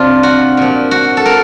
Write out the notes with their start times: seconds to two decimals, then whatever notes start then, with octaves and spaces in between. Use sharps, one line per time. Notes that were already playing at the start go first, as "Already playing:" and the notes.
Already playing: C3 D4 F4
0.23 F#4
0.57 A#2 F3
0.91 F#4
1.17 A4
1.26 A#4